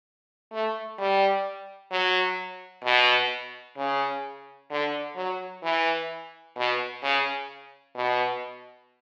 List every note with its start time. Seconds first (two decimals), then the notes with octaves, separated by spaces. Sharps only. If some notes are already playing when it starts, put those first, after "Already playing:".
0.52 A3
0.99 G3
1.91 F#3
2.84 B2
3.77 C#3
4.71 D3
5.16 F#3
5.63 E3
6.56 B2
7.03 C#3
7.95 B2